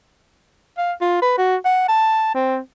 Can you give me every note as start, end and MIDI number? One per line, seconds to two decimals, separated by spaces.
0.78 0.92 77
1.01 1.21 65
1.22 1.33 71
1.38 1.57 66
1.65 1.84 78
1.88 2.34 81
2.35 2.58 60